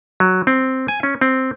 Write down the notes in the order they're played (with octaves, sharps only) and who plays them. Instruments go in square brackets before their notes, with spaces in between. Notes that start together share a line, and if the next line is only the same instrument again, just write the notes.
[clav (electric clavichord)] F#3
C4
G#5
C#4
C4